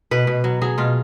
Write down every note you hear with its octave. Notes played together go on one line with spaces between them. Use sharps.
B2 B4
B2
F#3
F#3 G#4
B2 F4